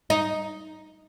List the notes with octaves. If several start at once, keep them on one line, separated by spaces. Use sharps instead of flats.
D#4